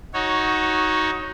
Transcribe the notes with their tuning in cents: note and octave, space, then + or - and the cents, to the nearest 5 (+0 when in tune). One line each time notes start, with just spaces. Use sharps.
D#4 +15 F#4 +0 C#5 -5